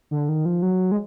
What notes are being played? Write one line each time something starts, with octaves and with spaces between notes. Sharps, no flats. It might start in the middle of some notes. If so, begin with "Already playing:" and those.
D3
D#3
F3
F#3
G#3